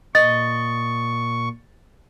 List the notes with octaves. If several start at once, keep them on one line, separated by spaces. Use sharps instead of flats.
A#2 D#5 C#6 A6